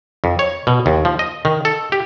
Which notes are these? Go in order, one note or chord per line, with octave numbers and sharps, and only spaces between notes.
F2
C#5
B2
D#2
F3
D#5
D#3
A4
G4